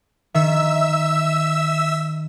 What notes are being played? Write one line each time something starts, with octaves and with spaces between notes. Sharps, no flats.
D#3 E5 E6